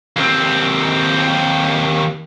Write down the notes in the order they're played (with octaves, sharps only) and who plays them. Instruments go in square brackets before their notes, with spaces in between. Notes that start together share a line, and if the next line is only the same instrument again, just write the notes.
[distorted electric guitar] D#2 C4